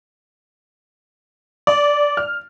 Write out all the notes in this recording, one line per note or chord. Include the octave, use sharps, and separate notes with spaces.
D5
F6